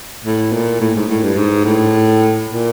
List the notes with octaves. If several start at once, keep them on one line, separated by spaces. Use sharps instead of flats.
A2
A#2
A2
G#2
A2
G2
G#2
A2
A#2